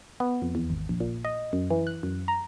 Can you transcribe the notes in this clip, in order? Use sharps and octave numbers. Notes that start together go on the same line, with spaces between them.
B3
F2
E2
G#1
A#1
A#2
D#5
F#2
E3
F#6
F#2
A#5